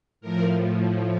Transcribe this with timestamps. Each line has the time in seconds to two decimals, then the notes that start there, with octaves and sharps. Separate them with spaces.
0.21 A2 F3 A#4